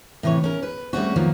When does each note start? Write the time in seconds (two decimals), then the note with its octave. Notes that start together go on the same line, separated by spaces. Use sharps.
0.23 A2 C3 E3 B4 C#5
0.44 C#4 A#4
0.63 B4
0.93 G3 A3 A#3 C4 C#4 F#4
1.16 D#3 F3 F#3 A#3 B3